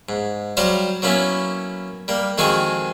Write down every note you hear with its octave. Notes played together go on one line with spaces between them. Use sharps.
G#2
F#3 G3 F#4 C5 F5 A#5
F#3 A#3 B3 C#4 E4
G3 A#3
F2 D#3 G#3 C4 F#4 G#5